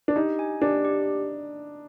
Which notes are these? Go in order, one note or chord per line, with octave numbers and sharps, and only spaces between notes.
D4
D#4 G4
G#5
D4 G4
G4